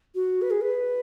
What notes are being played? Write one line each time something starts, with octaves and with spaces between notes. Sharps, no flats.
F#4
B4
G#4
B4